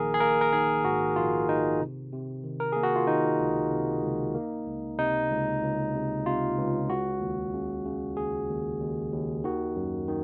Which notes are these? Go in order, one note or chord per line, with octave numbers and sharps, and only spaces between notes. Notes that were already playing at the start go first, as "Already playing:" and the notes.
Already playing: A#1 D#3 A#3 G#4 A#4
G#4
A#3 A#4
A#4
D#3 G#4
G#2 F#4
A#1 F4
D#3 D#4
C3
C3
D#3
A#4
A#3 G#4
F#4
F4
D#3 D#4
C#2
C3
C#2
A#3
C#2
C3 D#4
C#2
C#2
C3
C3 F4
C#2
C#3 F#4
D#2
C#3
C#3
D#2 G#4
D#2
D#2
D#2
D#3 F#4
F#2
D#3